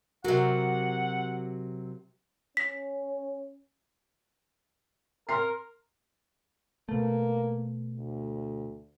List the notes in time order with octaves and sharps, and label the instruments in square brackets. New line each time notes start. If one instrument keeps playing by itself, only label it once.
[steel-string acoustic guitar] C3 F#3 [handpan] F#4 A#4 [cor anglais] F#5
[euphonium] C#4 [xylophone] B6
[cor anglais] A#4 [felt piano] C6 F6 C7
[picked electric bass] B2 A3 [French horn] A#3
[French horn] D2